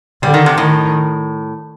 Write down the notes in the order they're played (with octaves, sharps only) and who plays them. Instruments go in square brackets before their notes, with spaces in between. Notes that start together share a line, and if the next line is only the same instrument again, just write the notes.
[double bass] D3 [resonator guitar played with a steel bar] G3
[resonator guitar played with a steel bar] D#3
C3
[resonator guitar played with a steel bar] A2 [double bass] D#3